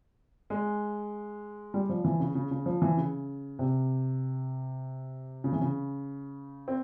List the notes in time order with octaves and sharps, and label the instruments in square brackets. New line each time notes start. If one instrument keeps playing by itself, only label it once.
[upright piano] G#3
G3
F3
E3
C#3
C#3
C#3
F3
E3
C#3
C3
C#3
E3
C#3
C4